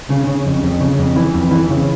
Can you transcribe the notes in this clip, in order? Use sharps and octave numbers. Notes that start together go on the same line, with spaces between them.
C#3
C#3
F2
F2
C#3
F2
E3
F2
E3
C#3